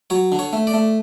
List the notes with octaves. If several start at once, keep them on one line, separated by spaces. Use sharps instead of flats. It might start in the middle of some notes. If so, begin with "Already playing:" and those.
F#3 C#5
D3
C#5
A3
D5
A3